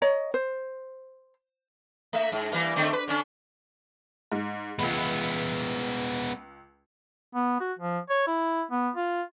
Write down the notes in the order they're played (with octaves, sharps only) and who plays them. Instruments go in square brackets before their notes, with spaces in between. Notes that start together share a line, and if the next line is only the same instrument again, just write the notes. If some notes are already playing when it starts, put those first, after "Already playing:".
[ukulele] C#5 D#5 A#5
C5
[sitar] A3 E5
G#2
E3 G3 A#3
D3 A3 C4
B4
D3 C#4 D4
[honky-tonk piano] G#2
[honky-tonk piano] C#2 B5 [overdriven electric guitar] G#3 B3
[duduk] B3
F#4
F3
C#5
E4
B3
F4